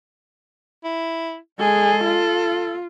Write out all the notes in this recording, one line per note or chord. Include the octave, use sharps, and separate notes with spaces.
E4
G#3 G#4 A4
F4